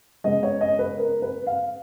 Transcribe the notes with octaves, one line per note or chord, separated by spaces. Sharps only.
C#3 G#3 B3 D#5
C#5
D#5
B4
A#4
B4
F5